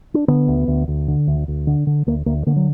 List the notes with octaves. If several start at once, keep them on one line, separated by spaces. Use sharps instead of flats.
D4
D3 B3
D2
D2
D2
D3
D2
D2
D3
D3
D2 A#3
D2 A#3
D3 A#3
F#3